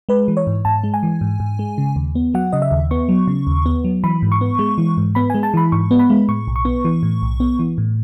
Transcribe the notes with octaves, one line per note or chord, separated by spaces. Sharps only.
G#3 B4
E3
C#5
G#2
G#2 A5
G#3
G#5
E3
G#2
G#2
G#3
C#3
D#2
B3
F#3 F#5
C#3 D#5
E5
D#2
B3 C#6
F#3
C#3
D#2
B3
F#3
E3 B5
G#2
C#6
B3
G#3
E3
G#2
B3 B5
G#3 G#5
A5
E3 B5
G#2 C#6
B3
B5
G#3
A2 C#6
B1
C#6
B3
E3
A2
B1
B3
E3
A2